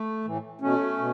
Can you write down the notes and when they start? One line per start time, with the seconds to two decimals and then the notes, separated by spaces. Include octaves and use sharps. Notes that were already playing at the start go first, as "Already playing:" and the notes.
Already playing: A3
0.25 A2 E3
0.61 B2 A3 C#4
0.98 B2